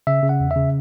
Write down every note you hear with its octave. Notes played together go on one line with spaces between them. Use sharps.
C#3 E5
C#3
F#5
E2
E5
C#3